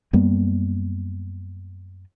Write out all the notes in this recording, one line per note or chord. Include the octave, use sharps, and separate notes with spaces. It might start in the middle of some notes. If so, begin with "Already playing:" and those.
F#2 G3 A#3 B3